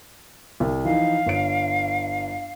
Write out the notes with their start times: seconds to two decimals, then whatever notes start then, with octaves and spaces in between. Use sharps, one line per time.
0.60 C2
0.85 E3 F3 D#4 F5
1.26 G1 C#5 D7